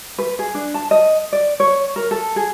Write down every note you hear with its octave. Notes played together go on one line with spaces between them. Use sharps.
B4
G#4
D4
A5
D#5
D5
C#5
A#4
A4
G#4